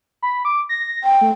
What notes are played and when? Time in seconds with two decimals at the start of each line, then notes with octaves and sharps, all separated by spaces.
0.22 B5
0.45 D6
0.69 A#6
1.04 G5
1.21 A3